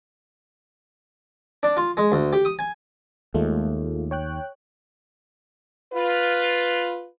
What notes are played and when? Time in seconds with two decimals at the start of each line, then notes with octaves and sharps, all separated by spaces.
1.63 D4
1.77 F4
1.97 G#3
2.12 D2
2.33 G4
2.45 D#6
2.59 G#5
3.34 D#2 G#3 A3 F4
4.11 C#5 G5 F#6
5.94 F4 B4